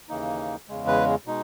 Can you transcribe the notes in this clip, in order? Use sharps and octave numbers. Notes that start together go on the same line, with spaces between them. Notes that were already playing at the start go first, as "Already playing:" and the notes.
D#2 C#3 E3 A#3 D#4
E2 C#3 G#3
B4
B2 G#3 D#4